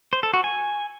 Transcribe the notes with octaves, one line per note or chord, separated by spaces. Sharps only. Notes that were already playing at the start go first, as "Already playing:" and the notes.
C5
A4
F#4
G#5